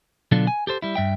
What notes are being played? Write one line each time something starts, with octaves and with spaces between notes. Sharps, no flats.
B2 D3 F#3 D4 F4 A4
G#5
G4 A4 C5
G3 E4
G2 E5 G5